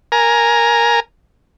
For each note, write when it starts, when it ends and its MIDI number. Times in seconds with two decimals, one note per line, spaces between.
0.12 1.00 70
0.12 1.00 80
0.12 1.00 82